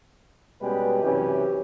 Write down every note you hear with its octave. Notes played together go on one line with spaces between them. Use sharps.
B2 G3 G#3 C#4 G4 B4
F#2 C3 E3 C#4 G4